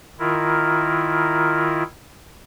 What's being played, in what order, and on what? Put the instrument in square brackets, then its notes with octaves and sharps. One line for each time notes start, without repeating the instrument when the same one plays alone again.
[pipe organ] D#3 E4 F4 A#4